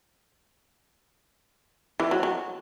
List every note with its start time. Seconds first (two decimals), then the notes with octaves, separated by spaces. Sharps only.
2.00 E3
2.11 F#3
2.23 F#3